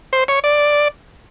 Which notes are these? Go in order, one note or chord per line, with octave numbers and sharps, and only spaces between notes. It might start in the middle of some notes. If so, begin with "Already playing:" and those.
C5
C#5
D5